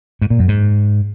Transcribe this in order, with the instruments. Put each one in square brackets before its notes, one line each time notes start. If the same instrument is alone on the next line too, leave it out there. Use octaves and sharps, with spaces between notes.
[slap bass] G#2
A#2
F#2
G#2